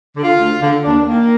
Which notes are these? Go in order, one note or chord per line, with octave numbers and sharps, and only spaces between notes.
D3
F4
D2
D3
D#2 D4
D#3 A#3